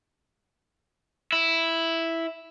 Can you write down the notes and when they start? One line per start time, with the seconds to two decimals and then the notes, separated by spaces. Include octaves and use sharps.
1.32 E4